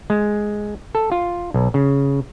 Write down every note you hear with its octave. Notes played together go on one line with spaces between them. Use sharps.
G#3
A4
F4
B1
C#3